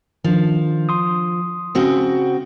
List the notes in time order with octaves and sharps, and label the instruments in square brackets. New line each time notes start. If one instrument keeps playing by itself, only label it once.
[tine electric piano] D#3 D4 [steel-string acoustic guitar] F3
[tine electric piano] C6 D#6
[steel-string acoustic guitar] C#3 C4 F#4